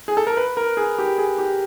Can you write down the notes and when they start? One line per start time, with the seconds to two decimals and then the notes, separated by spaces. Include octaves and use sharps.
0.08 G#4
0.17 A4
0.27 A#4
0.37 B4
0.57 A#4
0.77 G#4
0.99 G4
1.18 G#4
1.38 G4